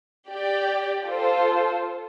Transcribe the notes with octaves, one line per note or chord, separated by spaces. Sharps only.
G4 D5 G5
F4 A4 C5